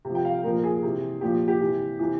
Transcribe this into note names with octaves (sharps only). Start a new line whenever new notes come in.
C3 F3
G5
F5
A#2 F3 A#4
G#4
C3 E3
A#2 F3 G4
G4
C3 E3
C3 E3